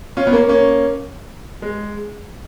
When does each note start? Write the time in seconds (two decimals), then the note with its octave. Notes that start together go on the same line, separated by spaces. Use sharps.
0.17 C#4 F4
0.27 B3
0.32 A#3 C#4
0.49 A#3 C#4
1.62 G#3